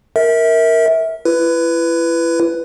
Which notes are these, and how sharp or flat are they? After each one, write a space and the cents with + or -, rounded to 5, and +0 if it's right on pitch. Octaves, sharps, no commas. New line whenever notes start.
A#4 +0 E5 -25
E4 +35 B4 +5